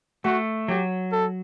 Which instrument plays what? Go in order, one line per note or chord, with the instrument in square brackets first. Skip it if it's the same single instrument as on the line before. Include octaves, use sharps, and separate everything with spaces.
[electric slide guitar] A3 [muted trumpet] F#4
[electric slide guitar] F#3 [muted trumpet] G4
[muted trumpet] A4